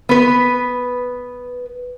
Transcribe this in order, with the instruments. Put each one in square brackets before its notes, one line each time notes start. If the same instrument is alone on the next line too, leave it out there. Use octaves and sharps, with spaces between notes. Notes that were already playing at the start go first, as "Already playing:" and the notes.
[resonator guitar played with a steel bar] B3 B4